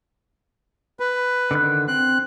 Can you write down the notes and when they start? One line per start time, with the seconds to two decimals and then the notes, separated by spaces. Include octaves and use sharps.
1.00 B4
1.51 D3 D#3 F#6
1.88 C4 F#6